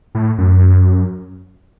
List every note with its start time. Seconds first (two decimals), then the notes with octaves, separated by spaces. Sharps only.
0.15 A2
0.38 F#2